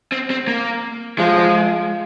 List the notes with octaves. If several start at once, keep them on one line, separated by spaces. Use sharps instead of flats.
C4
C4
A#3
F3 G#3